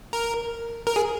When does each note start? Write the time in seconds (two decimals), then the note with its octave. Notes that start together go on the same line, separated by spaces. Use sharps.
0.13 A#4
0.87 A#4
0.96 G#4